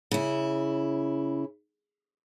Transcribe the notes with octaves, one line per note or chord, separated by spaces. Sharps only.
C#3 E4